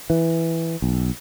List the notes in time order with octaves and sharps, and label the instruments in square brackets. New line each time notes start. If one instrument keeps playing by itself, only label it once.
[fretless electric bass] E3
B1